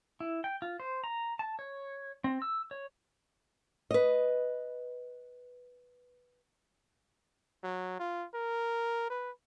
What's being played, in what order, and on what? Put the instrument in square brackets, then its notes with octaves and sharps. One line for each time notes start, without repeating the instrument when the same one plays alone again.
[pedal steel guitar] E4
G5
F4
C5
A#5
A5
C#5
C4
E6
C#5
[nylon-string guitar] B4 D#5
[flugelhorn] F#3
F4
A#4
B4